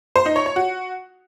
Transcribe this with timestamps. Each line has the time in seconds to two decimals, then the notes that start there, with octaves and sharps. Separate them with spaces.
0.16 C5
0.26 D#4
0.36 C#5
0.46 C#5
0.56 F#4